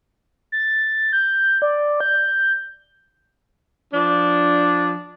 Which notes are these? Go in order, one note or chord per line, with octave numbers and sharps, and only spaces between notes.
A6
G6
D5
G6
F3 D4